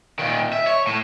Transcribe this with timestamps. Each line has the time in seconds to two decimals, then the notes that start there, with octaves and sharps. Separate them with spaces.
0.19 A#2 D#3
0.53 E5
0.67 C#5
0.87 A2